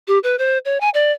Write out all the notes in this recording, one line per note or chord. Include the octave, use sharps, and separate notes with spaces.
G4
B4
C5
C#5
G#5
D5